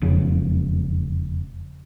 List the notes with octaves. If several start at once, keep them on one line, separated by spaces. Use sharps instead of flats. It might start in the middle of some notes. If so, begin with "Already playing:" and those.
E1 F2 C#3